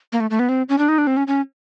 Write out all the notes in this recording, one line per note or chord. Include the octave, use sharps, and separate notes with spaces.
A#3
A3
A3
B3
C4
C#4
D4
D#4
D4
C4
C#4
C#4